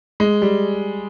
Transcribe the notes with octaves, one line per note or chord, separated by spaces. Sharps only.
G#3
G3